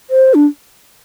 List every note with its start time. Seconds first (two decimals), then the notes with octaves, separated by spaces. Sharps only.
0.10 C5
0.34 D4